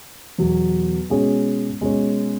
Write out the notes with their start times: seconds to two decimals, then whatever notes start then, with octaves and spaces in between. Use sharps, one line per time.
0.38 E2 B2 F#3
1.10 B2 G#3 C#4 G#4 C#5
1.81 B2 G#3 C#4 G#4 C#5